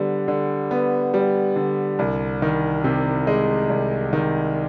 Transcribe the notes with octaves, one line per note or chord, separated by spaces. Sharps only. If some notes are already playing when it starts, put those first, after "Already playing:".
Already playing: D3 G3 B3
D3
B3
G3
D3
C2
D#3
C3
G#3
C2
D#3